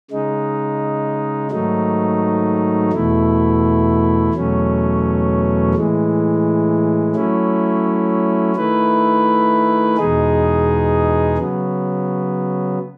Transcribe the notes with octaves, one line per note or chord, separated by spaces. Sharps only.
C#3 G#3 D#4
G#2 D#3 F#3 A3 D#4
E2 B2 A3 E4
E2 B2 F#3 A3 C#4
A2 E3 G#3
F#3 A3 C#4 E4
D#3 A3 E4 B4
E2 B2 G#3 D#4 G#4
C#3 F#3 B3